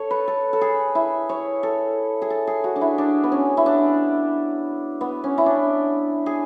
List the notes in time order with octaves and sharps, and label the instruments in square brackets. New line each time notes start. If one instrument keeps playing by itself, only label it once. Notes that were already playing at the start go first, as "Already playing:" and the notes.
Already playing: [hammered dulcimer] A4 C#5
B4
A4
A4
G#4
E4
C#5
A4
G#4
A4
G#4
F#4
D4
E4
D4
B3
C#4
E4
D4
B3
C#4
E4
D4
G#4